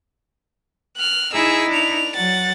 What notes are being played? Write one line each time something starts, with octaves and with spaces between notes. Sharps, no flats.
F6 F#6
D#4 E4 G#4 E6
D4 F7
F#3 F#5 A6